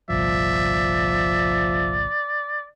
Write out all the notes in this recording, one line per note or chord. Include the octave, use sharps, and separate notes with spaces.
G1 C2 A#2 F3 D5 E5